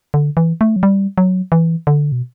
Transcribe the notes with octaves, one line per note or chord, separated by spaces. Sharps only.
D3
E3
A3
F#3
G3
F#3
E3
D3
B2